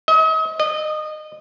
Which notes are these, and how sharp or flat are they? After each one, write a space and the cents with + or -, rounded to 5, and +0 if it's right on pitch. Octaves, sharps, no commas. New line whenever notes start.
D#5 +40
D#5 -25